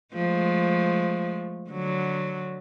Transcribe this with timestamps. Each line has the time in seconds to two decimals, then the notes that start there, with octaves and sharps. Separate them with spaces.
0.14 F3 G#3 A3
1.70 D3 F#3